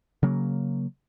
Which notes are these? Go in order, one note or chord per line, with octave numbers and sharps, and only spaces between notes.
C#3 F#3 A#3